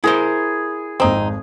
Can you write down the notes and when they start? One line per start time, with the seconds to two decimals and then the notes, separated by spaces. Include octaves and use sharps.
0.04 E4 G#4 A#4 C5
1.00 G#1 F2 C4 D#4